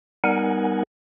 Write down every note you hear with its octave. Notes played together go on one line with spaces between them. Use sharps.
G3 B3 D#4 A#4 F#5 G#5